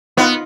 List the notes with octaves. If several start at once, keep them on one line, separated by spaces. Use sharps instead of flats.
B3 D#4 F4